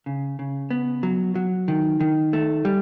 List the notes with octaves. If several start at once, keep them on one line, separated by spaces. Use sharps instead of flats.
C#3
C#3
B3
F#3
F#3
D#3
D#3
A3
G3